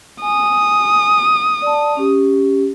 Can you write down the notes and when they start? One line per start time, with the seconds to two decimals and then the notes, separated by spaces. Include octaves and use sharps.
0.22 G#5 D#6
1.62 D5 A5
1.97 C#4 G4